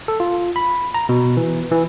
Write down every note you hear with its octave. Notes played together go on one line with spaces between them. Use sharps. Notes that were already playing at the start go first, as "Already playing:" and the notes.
A4
F4
B5
A#5
B2
E3
E3